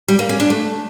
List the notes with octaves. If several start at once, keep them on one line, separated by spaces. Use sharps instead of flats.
G3
A#3
C#4
D4
A3